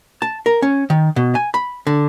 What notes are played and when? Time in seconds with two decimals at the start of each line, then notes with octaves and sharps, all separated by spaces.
0.22 A5
0.46 A#4
0.62 C#4
0.90 D#3
1.16 B2
1.35 G#5
1.54 B5
1.87 D3